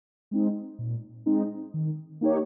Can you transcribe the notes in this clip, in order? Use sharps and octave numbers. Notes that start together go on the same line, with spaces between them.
G#3 C4 D#4
A#2
G#3 C4 D#4
D#3
A#3 D#4 G4 C#5